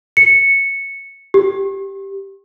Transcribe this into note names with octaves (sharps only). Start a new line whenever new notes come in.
C#7
G4